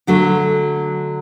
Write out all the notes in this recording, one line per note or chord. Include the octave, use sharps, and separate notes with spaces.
D3 F#3 A3